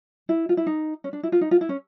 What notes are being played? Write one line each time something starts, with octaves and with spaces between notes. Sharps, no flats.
E4
F4
E4
D#4
C#4
D4
E4
F4
D#4
F4
E4
C#4